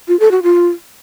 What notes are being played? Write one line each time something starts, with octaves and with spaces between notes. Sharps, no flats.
F4
A4
F#4
F4